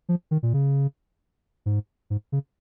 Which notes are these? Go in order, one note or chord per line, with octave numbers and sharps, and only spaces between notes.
F3
D#3
A#2
C#3
G#2
G#2
C#3